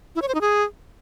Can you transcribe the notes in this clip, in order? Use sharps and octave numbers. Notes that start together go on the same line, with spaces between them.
E4
C#5
C5
D#4
G#4